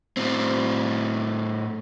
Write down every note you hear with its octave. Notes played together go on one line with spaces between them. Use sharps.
A2 C4